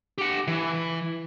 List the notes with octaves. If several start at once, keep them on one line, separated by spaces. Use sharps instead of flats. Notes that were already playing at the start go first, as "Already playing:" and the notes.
G4 F#5
E3